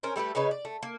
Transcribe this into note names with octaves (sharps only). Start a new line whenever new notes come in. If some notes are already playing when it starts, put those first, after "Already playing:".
C#4 A#4 C5
G3 A3 G4 B4
C#3 D#4 B4 C#5
D5
A3
A#3